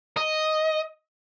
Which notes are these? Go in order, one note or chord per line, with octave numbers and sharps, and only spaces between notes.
D#5